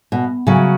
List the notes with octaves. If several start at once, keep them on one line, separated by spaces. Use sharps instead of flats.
B2
C#3 F#3